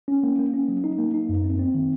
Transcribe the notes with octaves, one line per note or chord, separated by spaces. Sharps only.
C#4
A#3
A#3
C#4
F#3
D#4
A#3
D#4
F#2
C4
C4
D#3